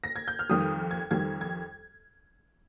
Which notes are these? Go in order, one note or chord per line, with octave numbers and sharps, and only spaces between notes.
A#6
G#6
G6
F6
F2 D#3 G3 D#6
G#6
F2 D#3 G3 G#6
G#6